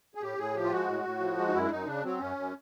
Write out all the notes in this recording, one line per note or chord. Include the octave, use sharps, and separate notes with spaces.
G#4
A2 G4
A2 G#4
F3 G4
F4
G#3 F#4
A2
A2
F3
G#3
D#4
F#2 E4
D4
F#2 D#4
C#3 D4
F#3 C4
F#2 C#4
F#2